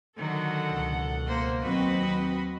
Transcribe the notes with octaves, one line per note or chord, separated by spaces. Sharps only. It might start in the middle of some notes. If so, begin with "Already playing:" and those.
D3 D#3 F#3 A4 F#5
C#2 B2
A#3 C5
D#2 F#3 C4 F#4 B4 D#5 B5